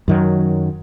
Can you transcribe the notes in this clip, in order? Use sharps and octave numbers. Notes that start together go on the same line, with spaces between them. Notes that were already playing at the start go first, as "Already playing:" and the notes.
F#2 D#3 F#3